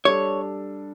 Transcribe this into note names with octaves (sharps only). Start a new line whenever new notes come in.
G3 D4 A4 C#5